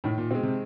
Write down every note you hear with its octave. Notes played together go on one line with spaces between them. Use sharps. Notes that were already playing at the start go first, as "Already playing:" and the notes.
A2 D#3
A#2
B2 G#3 C4
C3